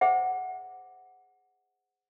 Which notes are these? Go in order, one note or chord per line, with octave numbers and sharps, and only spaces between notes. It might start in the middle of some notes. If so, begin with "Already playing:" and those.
G#4 C5 E5 F#5